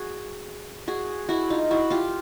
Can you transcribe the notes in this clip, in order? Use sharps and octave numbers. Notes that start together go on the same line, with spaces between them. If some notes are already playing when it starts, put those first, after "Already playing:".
Already playing: F#4 G#4
F#4 G#4
E4 F#4
D#4 F4
E4 F#4
F4 G4